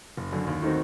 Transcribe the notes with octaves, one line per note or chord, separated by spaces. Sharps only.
F#1
F#2 D3
D#2
D#3 A3 C4 F#4